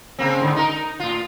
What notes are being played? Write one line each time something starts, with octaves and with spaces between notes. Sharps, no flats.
C#3 A#3 C4
G#2 D3
D#4 A#4
A2 F4